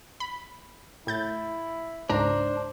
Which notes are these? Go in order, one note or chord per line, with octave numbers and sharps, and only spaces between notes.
B5
A2 E4 G6 A6
C#2 G#2 D4 C5 A#5